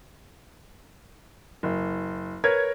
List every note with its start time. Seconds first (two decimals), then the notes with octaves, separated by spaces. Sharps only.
1.63 F#1
2.44 A#4 B4 C#5 G#6